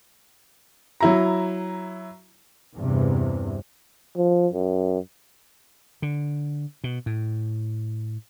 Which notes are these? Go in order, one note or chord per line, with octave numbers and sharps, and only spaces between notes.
F#3 E4 A#5
E2 G2 C3
F3
F#2
D3
B2
A2